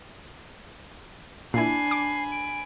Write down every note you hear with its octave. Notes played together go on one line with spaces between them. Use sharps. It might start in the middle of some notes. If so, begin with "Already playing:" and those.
A#2 D4 E4 G#5 B5 C7
D6
D7